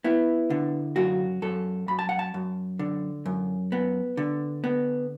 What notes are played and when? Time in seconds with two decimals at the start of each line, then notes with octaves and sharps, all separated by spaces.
0.04 B3 E4
0.50 D3
0.96 F#2 F#4
1.42 F#2 A4
1.88 F#2 B5
1.99 A5
2.09 F#5
2.19 A5
2.34 F#2
2.79 D3
3.26 F#2
3.72 B3
4.17 D3
4.64 B3